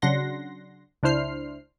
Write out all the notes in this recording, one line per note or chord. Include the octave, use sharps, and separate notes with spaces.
C#3 F#3 D4 F#5 C6 A#6
C#2 D4 E4 C5 F6 C7